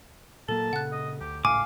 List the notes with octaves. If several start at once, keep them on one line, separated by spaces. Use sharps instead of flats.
A#2 F#3 A#3 A4 A5
A#2 C#3 F#5 F#6
D#5
D2 G4
G#1 C#2 A2 F5 G#5 D6